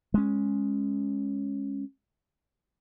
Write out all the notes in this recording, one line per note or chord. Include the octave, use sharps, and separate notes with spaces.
G#3 C#4